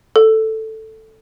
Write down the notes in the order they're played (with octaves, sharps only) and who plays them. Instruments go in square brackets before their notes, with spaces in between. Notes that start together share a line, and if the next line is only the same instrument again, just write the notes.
[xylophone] A4